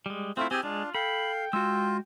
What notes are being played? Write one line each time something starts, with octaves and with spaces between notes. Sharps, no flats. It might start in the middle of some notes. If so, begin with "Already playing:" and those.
G3 G#3
A3 C4 E4 F4 F5
C4 E4 G4 G#4 G#5
G#3 D4 F4
A4 F5 G5 B5
G#3 F4 F#4 E6